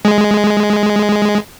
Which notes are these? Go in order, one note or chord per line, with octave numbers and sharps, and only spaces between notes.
G#3